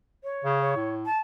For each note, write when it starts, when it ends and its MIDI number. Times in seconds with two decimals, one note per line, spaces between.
0.24 0.59 73
0.44 0.75 49
0.61 0.91 73
0.76 1.06 45
1.05 1.18 81